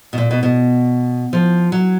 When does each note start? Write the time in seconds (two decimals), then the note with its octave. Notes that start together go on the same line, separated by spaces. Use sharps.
0.13 B2
0.18 A#2
0.31 B2
0.43 B2
1.33 F3
1.72 F#3